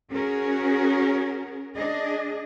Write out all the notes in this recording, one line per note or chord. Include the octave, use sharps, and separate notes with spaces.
C#4 F#4 G#4 A#4
D4 G#4 D#5